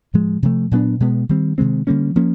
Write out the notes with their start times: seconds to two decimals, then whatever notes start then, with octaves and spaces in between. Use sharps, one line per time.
0.14 A2 F3 G#3
0.43 C3 F3 A3
0.71 A#2 F#3 B3 D4
1.00 B2 G#3 B3
1.29 D#3 G3 C4
1.58 C3 D#3 G#3 C4
1.87 D3 G3 A#3 C#4
2.16 F3 A#3 C#4